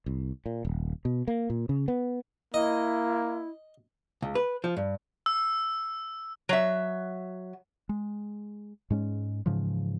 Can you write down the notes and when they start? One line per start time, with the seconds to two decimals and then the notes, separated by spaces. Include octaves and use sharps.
0.06 C2
0.46 A#2
0.65 D#1
1.05 B2
1.28 A#3
1.50 A#2
1.69 C#3
1.88 B3
2.54 A#3 E4 D#5
4.22 C#2
4.35 B4
4.64 F3
4.77 G2
5.26 E6
6.49 F#3 E5
7.89 G#3
8.90 G#2 G#3 C#4
9.46 G#2 C#3 E3 F3